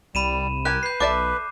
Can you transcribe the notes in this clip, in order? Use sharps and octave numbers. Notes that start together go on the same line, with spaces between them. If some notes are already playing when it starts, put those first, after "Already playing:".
C2 G3 B5 D#7 E7
G4 A#4 G#5 F#6
B4 G6 C7
B1 A4 D5 E5 D6 F#6